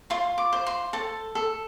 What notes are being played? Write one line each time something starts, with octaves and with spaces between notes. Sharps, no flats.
F4 C6
D6
C5
C6
A4 A5
A4